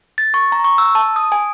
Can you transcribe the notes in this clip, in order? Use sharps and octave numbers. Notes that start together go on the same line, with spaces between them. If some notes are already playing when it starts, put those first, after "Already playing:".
A6
C#6
A#5
C#6
E6
A5
D#6
G#5